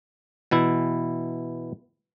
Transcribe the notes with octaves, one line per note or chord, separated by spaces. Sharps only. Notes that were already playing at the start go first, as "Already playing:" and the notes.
B2 E3 E4